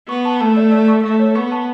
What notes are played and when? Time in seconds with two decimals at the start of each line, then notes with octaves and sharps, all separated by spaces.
0.09 B3 C#6
0.25 A5
0.41 A3 A5
0.57 D5
0.72 D5
0.88 C#6
1.04 A3 E5
1.19 C#5
1.35 B3 C#6
1.52 A5